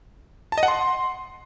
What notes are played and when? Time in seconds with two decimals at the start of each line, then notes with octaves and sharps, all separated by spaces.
0.52 A5
0.58 D#5
0.63 F#5
0.68 C6